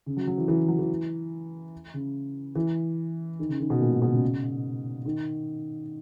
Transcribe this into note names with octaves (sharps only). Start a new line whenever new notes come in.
C#3
F#3
F#3
E3
E3
F#3
E3
C#3
E3
D#3
C#3
D#3
B2
A#2
G#2
B2
C#3
D#3